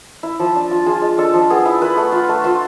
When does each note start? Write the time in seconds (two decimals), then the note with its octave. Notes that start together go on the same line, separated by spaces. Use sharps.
0.23 E4
0.39 F3
0.56 D4
0.71 F4
0.86 F4 G#4
1.02 G#3
1.18 D4 A4
1.34 F3
1.50 B3 G#4
1.65 E4
1.81 F4 B4
1.97 A3
2.12 F4
2.29 A3
2.44 F4 C5